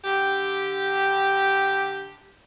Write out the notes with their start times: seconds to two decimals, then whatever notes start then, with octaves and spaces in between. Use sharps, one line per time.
0.05 D3 G4